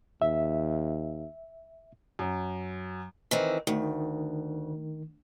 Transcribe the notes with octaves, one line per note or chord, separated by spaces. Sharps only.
D#2 E5
F#2
D#3 E3 C4
D2 D#3